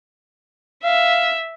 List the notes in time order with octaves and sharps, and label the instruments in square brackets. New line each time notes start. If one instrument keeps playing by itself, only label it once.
[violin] E5 [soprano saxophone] F5